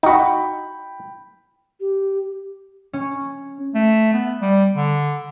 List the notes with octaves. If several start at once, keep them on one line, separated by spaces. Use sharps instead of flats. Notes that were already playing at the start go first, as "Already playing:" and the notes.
D#4 F#4 G5 B5
G4
C#4
A3
B3
G3
D3